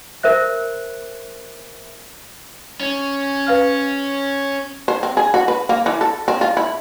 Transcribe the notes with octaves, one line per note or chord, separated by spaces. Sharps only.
A#4 C5 E5 F#6
C#4
B4 F5 F6
C5
C4
G#4
F#4
B4
A#3
E3
A4
C4
F4
E4